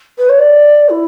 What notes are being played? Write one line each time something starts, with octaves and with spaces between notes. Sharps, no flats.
B4
C#5
D5
E4